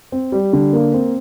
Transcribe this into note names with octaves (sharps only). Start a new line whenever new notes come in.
C4
G3
D3
A#3
C4